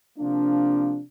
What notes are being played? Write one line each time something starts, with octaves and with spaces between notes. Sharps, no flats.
C3 F3 A#3 D4